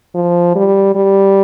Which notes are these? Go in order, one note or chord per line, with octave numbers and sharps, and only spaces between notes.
F3
G3
G3